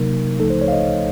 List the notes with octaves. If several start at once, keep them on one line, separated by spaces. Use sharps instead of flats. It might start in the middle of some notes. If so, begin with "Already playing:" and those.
Already playing: C3 F#3 A#3 D#4 A#4
C#2 C#3 F3 A3 D#4 A4
C5
C#5
F5
D#5